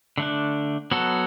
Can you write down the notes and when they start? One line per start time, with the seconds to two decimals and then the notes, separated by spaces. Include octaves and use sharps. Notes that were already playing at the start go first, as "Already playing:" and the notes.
0.18 D3 A3 D4
0.91 F#3 B3 F#4 A4